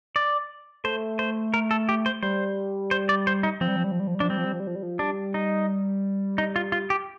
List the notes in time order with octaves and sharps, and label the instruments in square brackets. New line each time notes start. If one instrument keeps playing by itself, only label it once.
[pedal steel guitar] D5
[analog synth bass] A3 [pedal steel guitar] C5
[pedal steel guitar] C5
A#4
A4
G4
C5
[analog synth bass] G3 [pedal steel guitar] C5
[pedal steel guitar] C5
D5
C5
D#4
[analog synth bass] F3 [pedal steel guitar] C4
[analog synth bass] G3
F3
G3
F3
G3
F3
G3
[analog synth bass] F3 [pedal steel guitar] D4
[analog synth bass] G3 [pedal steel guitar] C4
[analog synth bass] F3
G3
F3
G3
F3
G3
F3
[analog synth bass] G3 [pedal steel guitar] D4
[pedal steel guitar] D#4
D#4
F4
F4
G4